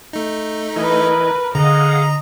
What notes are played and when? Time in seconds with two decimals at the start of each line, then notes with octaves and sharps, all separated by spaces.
0.13 A3 D#4
0.76 E3 E4 A#4 B4 D#5
1.55 D3 G#4 D#5 F5 F#5 A#5